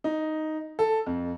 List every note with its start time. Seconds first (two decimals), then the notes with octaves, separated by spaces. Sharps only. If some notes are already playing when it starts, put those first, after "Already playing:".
0.04 D#4
0.79 A4
1.06 F2